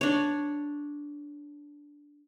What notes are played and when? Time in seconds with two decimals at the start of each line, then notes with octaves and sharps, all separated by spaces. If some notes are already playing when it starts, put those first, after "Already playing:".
0.01 D4 C#5